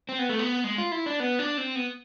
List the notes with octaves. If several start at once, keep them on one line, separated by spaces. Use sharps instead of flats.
C4
B3
A3
B3
G#3
F4
E4
D4
B3
D4
C4
B3